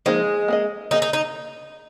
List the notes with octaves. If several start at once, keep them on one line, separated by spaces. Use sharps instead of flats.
F3 G#3 A#3 D#4 C5 D#5
A#3 G#4 D#5
A#3 D#4 G#4 D#5
D#4
D#4